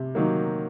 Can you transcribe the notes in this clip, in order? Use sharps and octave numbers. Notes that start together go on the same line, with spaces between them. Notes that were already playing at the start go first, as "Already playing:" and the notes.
Already playing: C3
D#3 F#3 A#3